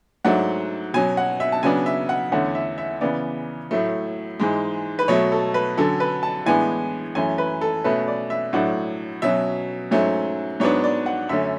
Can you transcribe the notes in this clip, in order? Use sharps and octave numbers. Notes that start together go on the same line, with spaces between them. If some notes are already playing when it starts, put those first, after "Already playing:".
G#2 F#3 A3 D4 F#5
B2 F#3 C#4 G#5
F#5
E5
A5
C#3 F#3 B3 D4 G#5
E5
F#5
E2 D3 A3 C#4 F#5
E5
E5
C#3 E3 B3 D5
A2 F#3 A3
G#2 E3 G#3
B4
B2 F#3 A3 C#5
A4
B4
D3 F#3 C#4 A4
B4
A5
A2 E3 G#3 B3 D4 G#5
F#2 E3 A3 C#4 G#5
B4
A4
B2 A3 C#4 B4
D5
E5
A2 F#3 A3 D4 F#5
B2 F#3 C#4 E5
G#2 F#3 A3 C#4
G#2 F#3 B3 D4 C#5
D5
F#5
F#2 D3 A3 C#4 E5